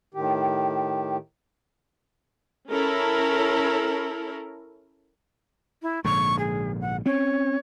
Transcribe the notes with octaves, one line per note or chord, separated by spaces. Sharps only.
A2 D#3 G4
C#4 E4 A4 A#4
E4
A#1 G#2 D3 C#6
G#4
F#5
C4 C#4 C#5